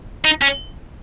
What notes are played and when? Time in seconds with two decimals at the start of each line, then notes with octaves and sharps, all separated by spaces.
0.25 D#4
0.42 C#4